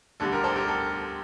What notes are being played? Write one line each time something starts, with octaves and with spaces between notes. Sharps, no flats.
D2 D3 G3 A4
G4 A#4
A4 C5
G4 A#4
A4